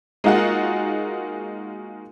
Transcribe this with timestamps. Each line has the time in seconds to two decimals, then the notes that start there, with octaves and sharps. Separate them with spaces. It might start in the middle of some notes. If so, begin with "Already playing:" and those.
0.24 G#3 A#3 D#4 F4 F#4 F#5